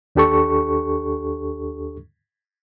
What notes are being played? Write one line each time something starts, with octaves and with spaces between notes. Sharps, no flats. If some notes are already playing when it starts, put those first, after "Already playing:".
D#2 D4 G4 A4 C#6